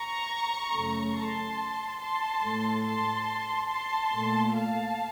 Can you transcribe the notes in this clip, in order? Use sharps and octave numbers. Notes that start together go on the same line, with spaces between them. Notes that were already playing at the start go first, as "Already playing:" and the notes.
Already playing: A#5 C#6
F#2 C#3 A3
A5 C6
A5 C6
A2 A3
A5 C6
A5 C6
A#2 A3
F5 A5